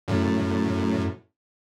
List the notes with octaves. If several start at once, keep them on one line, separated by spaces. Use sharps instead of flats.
F#2 A2